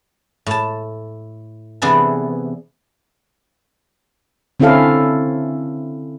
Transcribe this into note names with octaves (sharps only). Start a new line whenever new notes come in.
A2 A5
C3 E3 B3 D4 G#4 A4
D3 C4 C#4 E4 A4 F5